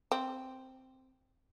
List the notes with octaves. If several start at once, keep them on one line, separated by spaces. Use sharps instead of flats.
C4